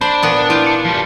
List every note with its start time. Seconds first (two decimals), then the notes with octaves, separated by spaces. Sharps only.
0.01 D4 C5 B5
0.23 A#2 B3 A5
0.50 E4 F4 F6 G6
0.67 C#7
0.85 F3 G3